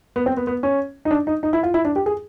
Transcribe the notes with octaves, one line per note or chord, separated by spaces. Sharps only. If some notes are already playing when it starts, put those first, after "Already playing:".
B3
C4
B3
B3
C#4
D#4
D4
D#4
D#4
E4
F4
E4
D4
G4
G#4